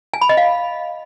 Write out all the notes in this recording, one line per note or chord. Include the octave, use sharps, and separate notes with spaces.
G#5
B5
D#5
F5